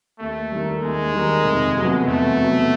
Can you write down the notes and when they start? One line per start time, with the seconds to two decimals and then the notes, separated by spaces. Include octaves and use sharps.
0.20 D#2 A3
0.52 D#3 G3
0.82 D#2 G#3
1.14 D#3 G3
1.44 F1
1.76 E2 B2 F#3 B3
2.07 F1 A3
2.38 E2 B2 F#3 B3